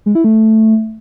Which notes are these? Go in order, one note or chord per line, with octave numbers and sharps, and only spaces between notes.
G#3
E4
A3